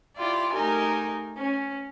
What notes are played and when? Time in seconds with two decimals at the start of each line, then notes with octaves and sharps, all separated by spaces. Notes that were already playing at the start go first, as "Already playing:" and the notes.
0.18 E4 F4 G4 D5
0.54 A3 D#4 G4 A#4 G#5
1.38 C#4